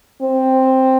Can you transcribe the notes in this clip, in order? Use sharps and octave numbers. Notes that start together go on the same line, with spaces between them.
C4